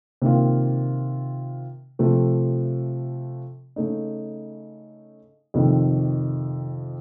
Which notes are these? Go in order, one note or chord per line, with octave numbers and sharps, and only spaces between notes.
C3 D#3 A#3 F4
C3 F3 A3
C#3 A3 D#4
F2 C3 D#3